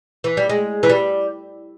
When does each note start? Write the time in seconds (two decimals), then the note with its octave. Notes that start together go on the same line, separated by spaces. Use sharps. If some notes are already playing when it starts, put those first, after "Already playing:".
0.24 E3
0.37 G3
0.49 G#3
0.83 E3
0.90 G3